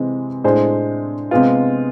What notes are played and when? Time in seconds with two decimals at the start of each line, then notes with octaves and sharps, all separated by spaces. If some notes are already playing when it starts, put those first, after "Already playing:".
Already playing: C3 E3 G#3 C4
0.44 A2 G#3 D4 G#4 C5
1.31 C3 G#3 B3 F4